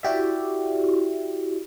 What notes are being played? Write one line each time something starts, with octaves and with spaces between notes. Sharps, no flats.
E4 F#4 G4 D5 E5